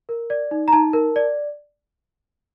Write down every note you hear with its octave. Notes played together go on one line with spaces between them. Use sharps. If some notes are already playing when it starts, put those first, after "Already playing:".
A#4
D5
D#4
A#5
D#4 A5
A#4
D5